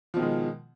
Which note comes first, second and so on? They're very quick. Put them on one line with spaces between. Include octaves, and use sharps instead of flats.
F3 B2 D#3 G#3